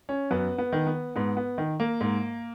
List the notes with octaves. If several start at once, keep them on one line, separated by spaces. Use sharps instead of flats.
C#4
F#2 B3
B3
D#3
B3
G#2 B3
B3
D#3
A#3
G#2